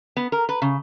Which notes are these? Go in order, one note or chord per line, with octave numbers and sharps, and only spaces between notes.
B3
A#4
B4
C#3